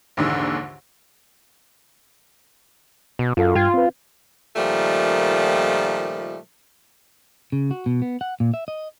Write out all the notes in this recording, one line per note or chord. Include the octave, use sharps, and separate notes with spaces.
A#1 D#2 G#2 D3 E3
B2
F#2 F4 A4 F5
G2 F4 G5 G#6
C4 B4
A#2 D#3 F3 G3 A3
C#3
F#4
B2
B3
F#5
A#2
E5
D#5